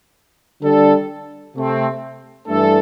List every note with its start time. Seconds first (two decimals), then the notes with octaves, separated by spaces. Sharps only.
0.62 D3 G3 D4 A4
1.55 C3 A3 C4
2.47 G2 E3 A3 D4 A4